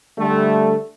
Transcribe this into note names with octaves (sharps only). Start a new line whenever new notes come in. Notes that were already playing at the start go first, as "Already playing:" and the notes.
D3 G3 A3